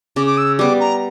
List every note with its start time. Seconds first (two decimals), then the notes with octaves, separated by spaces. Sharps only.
0.16 C#3 D6
0.27 D6
0.38 E6
0.59 G3 B3 D6
0.80 A#5